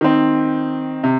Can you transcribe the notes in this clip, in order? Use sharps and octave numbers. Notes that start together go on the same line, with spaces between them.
D#3 C4
C3